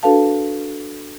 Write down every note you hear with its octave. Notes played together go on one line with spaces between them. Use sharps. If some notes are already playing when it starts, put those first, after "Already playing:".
D4 F#4 A4 B4 F5 A5